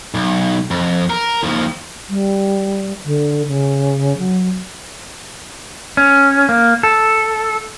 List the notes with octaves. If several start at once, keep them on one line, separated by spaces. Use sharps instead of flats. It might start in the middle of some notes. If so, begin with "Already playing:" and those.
B1
F2
A#4
D#2 F3
G3
D3
C#3
F#3
C#4
A#3
A4